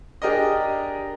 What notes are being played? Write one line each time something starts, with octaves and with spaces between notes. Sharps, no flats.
D4 G4 G#4 A#4 D5 D#5